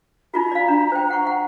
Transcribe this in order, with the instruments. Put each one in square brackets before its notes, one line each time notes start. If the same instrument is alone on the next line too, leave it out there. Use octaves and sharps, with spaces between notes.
[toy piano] D#4 F4 F#4 [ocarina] A#5
[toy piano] D5 F5
D4
C5 G5
F#5 C#6
F#5